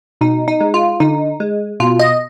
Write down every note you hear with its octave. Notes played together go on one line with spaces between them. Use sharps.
B2 D#4
D#4
G#3
F4
D3 D#4
G#3
B2 F4
D#5